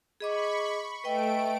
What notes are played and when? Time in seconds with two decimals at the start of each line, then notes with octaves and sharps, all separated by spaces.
0.20 G#4 D#5 B5 C#6 D6
1.04 A3 B4 D#5 G5 D7